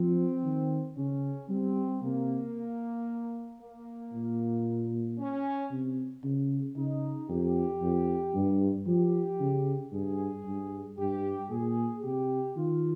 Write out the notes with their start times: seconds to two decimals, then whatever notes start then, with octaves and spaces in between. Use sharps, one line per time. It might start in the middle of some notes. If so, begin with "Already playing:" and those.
Already playing: F3 C4
0.44 D#3
0.96 C#3 C#4
1.49 G3 C4
2.02 C3 A#3
3.61 A#3
4.13 A#2
5.19 C#4
5.71 C3
6.24 C#3
6.76 C#3 D#4
7.29 F2 G4
7.82 F2
8.35 G2
8.87 F3 G4
9.40 C#3
9.92 G2 G#4
10.46 G2
10.98 G2 G4
11.50 A#2 G#4
12.03 C3 G4
12.56 D#3 F4